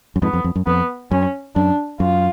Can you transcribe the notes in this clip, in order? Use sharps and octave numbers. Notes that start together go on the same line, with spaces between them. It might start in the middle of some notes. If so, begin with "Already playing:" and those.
F#2
F2 G#2 B3
F2
F2
F#2
F2 B3
F#2 C#4
F#2 D4
F#2 F4